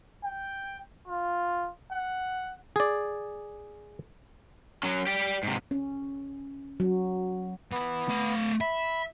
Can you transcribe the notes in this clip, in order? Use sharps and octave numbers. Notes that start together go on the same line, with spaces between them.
G5
F4
F#5
G#4 D5
F#3 C#4
G4 D5
G#2 C3
C#4
F#3
E3 B3
A3 F5
E5 B5